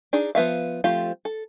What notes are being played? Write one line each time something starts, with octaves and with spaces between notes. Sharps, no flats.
D4 D#4 G#4
F3 B3 E5 F5
F3 A3 C4 F4 G4
A4